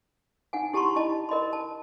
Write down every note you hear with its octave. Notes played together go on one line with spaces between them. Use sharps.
D#4 F#5 G#5
E4 G4 A5 A#5 C6 C#6
E4 D#5 A5 B5
A#4 D#5 B5 C6
A5